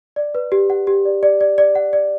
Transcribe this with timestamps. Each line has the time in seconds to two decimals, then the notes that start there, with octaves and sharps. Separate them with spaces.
0.16 D5
0.35 B4
0.52 G4
0.70 F#5
0.87 G4
1.05 D5
1.23 D5
1.41 D5
1.58 D5
1.75 F#5
1.93 D5